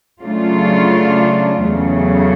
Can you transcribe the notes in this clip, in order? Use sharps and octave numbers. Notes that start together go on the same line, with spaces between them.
C#3 F#3 A3 D4 F4
E2 C#3 F#3 A3